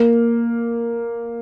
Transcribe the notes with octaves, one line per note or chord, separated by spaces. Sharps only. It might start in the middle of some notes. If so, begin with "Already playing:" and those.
Already playing: A#3